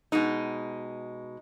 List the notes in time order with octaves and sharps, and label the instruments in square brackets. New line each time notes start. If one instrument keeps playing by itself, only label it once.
[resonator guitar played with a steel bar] B2 G#3 D#4